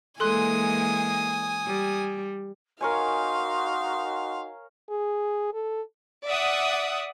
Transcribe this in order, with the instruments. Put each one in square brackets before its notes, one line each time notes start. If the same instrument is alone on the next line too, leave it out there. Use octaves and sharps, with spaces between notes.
[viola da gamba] E3 G#3 A#3 [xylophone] A4 C6 F#6 [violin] G#5 D#6
[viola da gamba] G3
[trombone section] D#4 F#4 [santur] A#4 C#5 G#5 [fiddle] F5 [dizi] C6
[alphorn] G#4
A4
[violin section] D5 E5 F#5 D#6